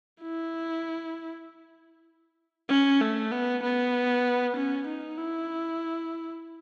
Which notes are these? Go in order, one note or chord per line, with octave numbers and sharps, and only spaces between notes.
E4
C#4
A3
B3
B3
C#4
D#4
E4